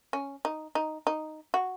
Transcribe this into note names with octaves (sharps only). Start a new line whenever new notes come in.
C#4
D#4
D#4
D#4
F#4